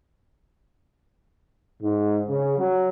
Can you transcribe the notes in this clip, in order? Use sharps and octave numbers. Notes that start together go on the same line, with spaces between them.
G#2
C#3
F#3